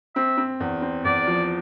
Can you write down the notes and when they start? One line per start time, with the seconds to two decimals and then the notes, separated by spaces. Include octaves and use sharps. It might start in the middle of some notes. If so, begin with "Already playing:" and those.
0.16 C4 E5
0.38 C4
0.60 E2
0.82 C4
1.05 E2 D5
1.27 F3